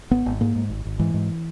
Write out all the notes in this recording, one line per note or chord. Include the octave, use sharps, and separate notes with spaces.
G#1 B3
G#1
G#2 A#3
G#2
G#1
G#1
G#2 E3
G#2